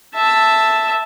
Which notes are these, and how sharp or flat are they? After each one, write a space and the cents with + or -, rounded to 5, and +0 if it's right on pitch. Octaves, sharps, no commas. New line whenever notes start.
E5 +0 A5 +0